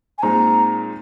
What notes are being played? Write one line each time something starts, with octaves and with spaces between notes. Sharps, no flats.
G#5
A#2 G#3 C4 D#4 A#5